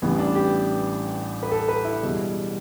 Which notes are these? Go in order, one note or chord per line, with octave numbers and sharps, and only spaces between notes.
A1 A2 E3 G3 B3
D4
G4
B4
A4
B4
E4
E1 E2 B2 G3